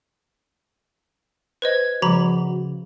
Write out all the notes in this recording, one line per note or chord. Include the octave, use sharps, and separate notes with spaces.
B4 C5 D#5 G#6
C#3 F3 G3 F#4 A#5 B5